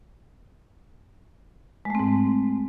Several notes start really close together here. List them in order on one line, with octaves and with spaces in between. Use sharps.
G#3 A3 C4 G#2